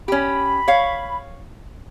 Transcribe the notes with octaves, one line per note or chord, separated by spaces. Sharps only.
C#4 G4 B5
C#5 F5